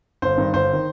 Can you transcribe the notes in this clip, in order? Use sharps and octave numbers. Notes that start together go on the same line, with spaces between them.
G1 C5
G2 D#3
G1 C5
D#3